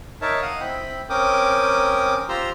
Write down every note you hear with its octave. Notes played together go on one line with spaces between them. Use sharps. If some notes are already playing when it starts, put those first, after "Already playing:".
D#4 A#4 C#5 E5 A5
D#5 F5 F#5 D#6
C4 E4 G5 B5
C4 C#4 A#4 G5 D6 D#6
F4 G4 C5 A#5 C6 E6